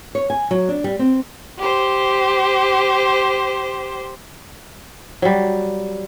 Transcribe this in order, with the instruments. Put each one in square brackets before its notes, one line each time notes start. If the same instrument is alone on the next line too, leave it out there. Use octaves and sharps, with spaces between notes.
[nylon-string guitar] C#5
G#5
F#3
D4
G3
C4
[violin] G4 C5
[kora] F#3 G3